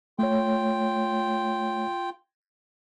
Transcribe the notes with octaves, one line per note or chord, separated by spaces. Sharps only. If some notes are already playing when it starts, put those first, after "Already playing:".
A3 F4 C#5 G5